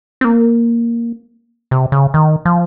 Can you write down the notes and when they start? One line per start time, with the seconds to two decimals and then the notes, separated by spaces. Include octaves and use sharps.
0.21 C4
0.25 A#3
1.71 C3
1.92 C#3
2.14 D#3
2.45 F3